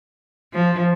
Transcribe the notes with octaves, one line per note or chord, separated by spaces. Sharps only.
F3